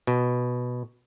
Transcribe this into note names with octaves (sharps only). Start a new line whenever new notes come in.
B2